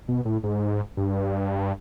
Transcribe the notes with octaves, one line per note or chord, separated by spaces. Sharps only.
B2
A2
G#2
G2